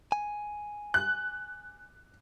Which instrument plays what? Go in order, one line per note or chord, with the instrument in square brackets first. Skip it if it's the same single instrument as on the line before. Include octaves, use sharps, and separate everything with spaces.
[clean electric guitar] G#5
[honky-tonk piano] F#6